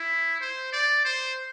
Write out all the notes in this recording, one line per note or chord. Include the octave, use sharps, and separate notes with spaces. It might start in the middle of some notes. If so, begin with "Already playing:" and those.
Already playing: E4
C5
D5
C5